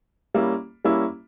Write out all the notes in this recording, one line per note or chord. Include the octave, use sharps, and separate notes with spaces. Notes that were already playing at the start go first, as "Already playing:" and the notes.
G3 A#3 C#4 E4
G3 A#3 C#4 E4